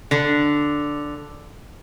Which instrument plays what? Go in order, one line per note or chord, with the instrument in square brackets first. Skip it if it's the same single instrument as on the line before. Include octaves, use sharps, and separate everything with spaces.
[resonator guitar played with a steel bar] D3 D4